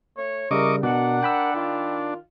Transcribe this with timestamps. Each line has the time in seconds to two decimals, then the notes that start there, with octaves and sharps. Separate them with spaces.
0.17 A3 C#5
0.51 C#3 G3 E4 A#4 D#5 C#6 D6
0.83 B2 D4 A#4 F#5
1.23 G5 B5 E6
1.55 D#3 F4